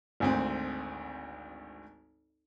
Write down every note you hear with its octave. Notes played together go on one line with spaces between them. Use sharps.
G#1 D2 C4